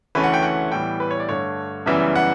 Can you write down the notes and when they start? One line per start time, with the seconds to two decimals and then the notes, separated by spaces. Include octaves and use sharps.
0.15 D2 C#3 E3 A3 C#4 B4
0.24 F#5
0.34 G5
0.43 F#5
0.72 A2 E3 G3 B3 G5
1.00 B4
1.11 C#5
1.20 D5
1.29 G2 D3 A3 C#5
1.86 F#2 C#3 E3 G3 B3 E5
2.16 F#5